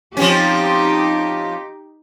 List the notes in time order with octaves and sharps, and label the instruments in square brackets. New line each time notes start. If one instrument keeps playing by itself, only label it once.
[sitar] F3 C4 C#4 [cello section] D#4 G4